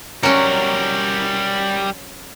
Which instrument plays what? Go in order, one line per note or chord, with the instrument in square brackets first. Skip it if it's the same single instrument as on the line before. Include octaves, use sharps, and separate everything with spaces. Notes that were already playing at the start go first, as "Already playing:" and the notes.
[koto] F#3 C#4 [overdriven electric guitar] G3 A#4